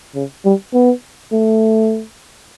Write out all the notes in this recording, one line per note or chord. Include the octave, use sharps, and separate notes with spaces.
C#3
G3
B3
A3